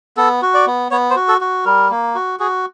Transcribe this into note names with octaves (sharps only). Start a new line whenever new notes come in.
B3 A4
F#4
D5
B3
B3 C#5
C5
F#4
A4
F#4
G3 A#4
A#3
F#4
F#4 G#4